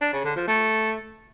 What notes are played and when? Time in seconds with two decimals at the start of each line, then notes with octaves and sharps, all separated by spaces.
0.01 D4
0.13 C#3
0.25 D3
0.36 F3
0.48 A3